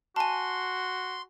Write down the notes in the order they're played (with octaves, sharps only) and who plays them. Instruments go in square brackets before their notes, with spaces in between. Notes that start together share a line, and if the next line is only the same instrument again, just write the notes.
[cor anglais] F#4 [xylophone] G#5 A5 [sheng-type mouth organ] C6